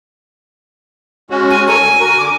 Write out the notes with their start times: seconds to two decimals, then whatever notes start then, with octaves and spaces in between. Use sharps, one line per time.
1.30 G#3 C#4 F#4
1.50 G#5
1.67 A4 A#4 C#5 G#5
1.82 D2 D3
1.99 F#4 A#4
2.19 D3 D6